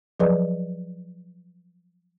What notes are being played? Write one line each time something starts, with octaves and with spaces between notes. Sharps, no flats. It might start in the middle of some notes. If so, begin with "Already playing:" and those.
F3 F#3 G#4 B4 D5 D#5